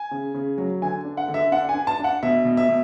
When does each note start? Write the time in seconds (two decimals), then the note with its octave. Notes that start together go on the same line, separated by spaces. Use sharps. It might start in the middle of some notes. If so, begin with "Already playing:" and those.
Already playing: G#5
0.11 C#3
0.34 C#3
0.58 F#3
0.82 D3 G#5
1.05 D4
1.17 F#5
1.28 D3
1.34 E5
1.52 D4 F#5
1.69 G#5
1.75 D4
1.87 A5
1.99 D4
2.04 F#5
2.23 B2 E5
2.45 B2
2.57 E5
2.69 B2